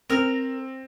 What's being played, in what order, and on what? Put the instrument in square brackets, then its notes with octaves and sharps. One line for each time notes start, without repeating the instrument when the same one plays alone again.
[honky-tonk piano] C4 [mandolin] A#4 F6